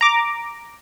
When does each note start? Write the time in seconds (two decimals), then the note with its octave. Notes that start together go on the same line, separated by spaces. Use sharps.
0.01 A#5 D6